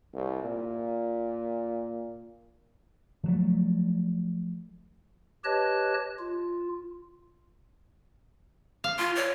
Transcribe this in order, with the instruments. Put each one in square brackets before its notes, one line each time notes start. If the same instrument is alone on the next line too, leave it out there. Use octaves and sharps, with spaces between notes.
[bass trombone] C2
A#2
[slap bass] F3 F#3 A3
[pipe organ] G4 B4 C#5 D#5 A5 F#6
F4
[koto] F5
[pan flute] F4
C#5